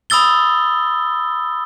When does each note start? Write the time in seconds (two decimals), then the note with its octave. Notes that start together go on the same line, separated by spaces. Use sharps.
0.10 B5 D#6 E6 A6 G7